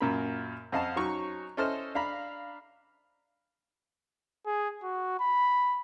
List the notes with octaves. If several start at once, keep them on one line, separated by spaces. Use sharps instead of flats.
F#2 A#2 A#4 B5
F2 D#5 F5 F#5 A5
F#3 C#4 D#4 C#6
C#4 E4 A4 C5 D#5 F6
D4 F5 A#5 B5
G#4
F#4
B5